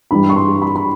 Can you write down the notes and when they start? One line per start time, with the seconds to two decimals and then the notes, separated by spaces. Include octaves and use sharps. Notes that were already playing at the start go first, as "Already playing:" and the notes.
0.11 G2 E3 G3 B5
0.30 C#6
0.36 C6
0.62 B5
0.76 B5